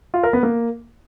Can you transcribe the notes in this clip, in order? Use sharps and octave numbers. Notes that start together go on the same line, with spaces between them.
F4
A#4
B3
A#3